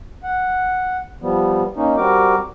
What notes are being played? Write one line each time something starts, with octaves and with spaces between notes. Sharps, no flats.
F#5
F3 G3 B3
A#3 C#4 D#4
G3 C4 F#4 A#4 D6